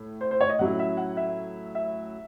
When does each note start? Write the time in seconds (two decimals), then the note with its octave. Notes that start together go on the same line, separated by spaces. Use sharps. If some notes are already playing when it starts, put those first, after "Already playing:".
Already playing: A2
0.21 C5
0.31 C5
0.41 C#5
0.49 D#5
0.59 A2 F#3 C#4 E4 F#5
0.79 E5
0.97 F#5
1.17 E5
1.75 E5